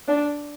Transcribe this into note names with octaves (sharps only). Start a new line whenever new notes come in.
D4